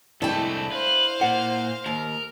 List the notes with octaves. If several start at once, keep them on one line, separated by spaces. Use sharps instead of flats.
C2 G#3 A3 D4 E4 A4 G5
B4 C5 F5
A#2 F#5
D#2 A#4